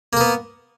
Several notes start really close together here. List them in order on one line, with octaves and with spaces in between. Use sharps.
A#3 A#4 B3